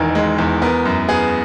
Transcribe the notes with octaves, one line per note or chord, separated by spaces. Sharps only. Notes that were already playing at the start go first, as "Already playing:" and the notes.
Already playing: E1 E2 D#3 A#4
G#3
E2
B3 A#4
F#2
B3 G#4